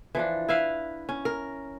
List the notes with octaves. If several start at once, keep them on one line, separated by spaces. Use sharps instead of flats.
E3 F3 D4
E4 B4 E5 F5
C#4
A#4